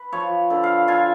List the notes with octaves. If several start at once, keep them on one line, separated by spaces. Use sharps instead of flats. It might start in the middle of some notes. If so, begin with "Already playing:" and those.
Already playing: B4
F3 C#5
D3
F5
F4 G#5